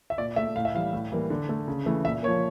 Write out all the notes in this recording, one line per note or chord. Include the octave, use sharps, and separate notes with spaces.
E5
A#2 D5
A3 E5
A2 F5
E5
E3 G3 F5
A2
E3 G3 A#3
D3
A3
C#3
E3 A3
A#2 E5
F3 A#3 C#5